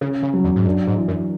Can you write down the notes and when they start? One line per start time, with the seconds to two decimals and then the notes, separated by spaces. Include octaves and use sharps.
0.01 C#3 C#4
0.23 C#3
0.34 F#3
0.44 E2
0.56 G#2
0.66 F#2 D4
0.87 G#2
0.97 E3
1.08 F#2